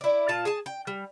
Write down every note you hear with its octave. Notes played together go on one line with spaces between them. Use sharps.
E4 D5
A#2 F4 A5
G#4 G#5 A5
G5
G3